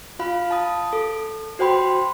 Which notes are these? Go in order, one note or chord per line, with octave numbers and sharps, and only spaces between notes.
F4 F5 B5
A5 D#6
A4
F#4 C5 G5 B5 C6